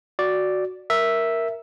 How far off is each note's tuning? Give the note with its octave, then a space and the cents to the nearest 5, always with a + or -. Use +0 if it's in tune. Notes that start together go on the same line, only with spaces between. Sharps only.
F#4 +0 D5 +0
A#4 +0 E5 +0